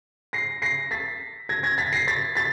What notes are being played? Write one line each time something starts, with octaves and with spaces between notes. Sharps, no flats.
A#6 C7
A#6 C7
A6 B6
G#6 A#6
G#6 A#6
A6 B6
A#6 C7
A6 B6
A6 B6